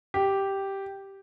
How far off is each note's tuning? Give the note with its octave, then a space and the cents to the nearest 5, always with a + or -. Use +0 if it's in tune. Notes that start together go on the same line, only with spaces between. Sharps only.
G4 -5